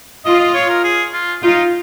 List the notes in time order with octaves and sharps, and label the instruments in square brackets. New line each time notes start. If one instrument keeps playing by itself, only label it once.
[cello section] F4 [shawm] D#5
[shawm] D#5
C#5
A#4
G#4
F4
[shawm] D#4 [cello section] F4